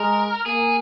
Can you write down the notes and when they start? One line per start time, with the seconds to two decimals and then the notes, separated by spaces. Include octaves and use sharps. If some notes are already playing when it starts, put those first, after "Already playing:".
Already playing: G#3 A#4
0.46 A#3 G#4